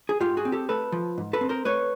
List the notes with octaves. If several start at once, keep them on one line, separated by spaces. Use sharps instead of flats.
G#4
G#2 F4 G4
F#4 G#4
C4
G4 A4
A3 A4 B4
F3
G#2
A4 B4
C4
A#4 C5
A3 B4 C#5